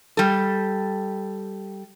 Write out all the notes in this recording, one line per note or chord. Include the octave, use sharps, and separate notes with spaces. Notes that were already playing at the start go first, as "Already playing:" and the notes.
G3 A4